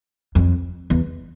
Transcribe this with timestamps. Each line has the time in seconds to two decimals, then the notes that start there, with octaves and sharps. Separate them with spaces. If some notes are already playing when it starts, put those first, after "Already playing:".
0.35 F2
0.90 E2